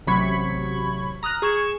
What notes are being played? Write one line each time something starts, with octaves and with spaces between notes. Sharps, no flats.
A1 C3 F#3 B5 C#6 G#6
A#5 D#6 F6 F#6 A#6
G#4 C#6 G#6 E7